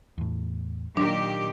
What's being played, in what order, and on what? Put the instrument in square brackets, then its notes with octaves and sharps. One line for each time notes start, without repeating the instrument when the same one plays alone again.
[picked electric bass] E2 A2
[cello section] A#2 D#3 G4 [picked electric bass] F#3 [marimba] D4